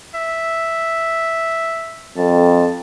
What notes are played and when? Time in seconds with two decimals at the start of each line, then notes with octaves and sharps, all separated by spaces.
0.14 E5
2.18 F2 A5